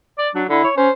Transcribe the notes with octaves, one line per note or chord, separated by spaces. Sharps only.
D5
F#3 D4
D3 E4
C#5
C#4 C5